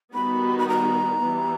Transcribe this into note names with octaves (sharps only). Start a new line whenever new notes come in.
D#3 G3 B3 D#4 F#4 B5
B5
A#5
E3 G3 B3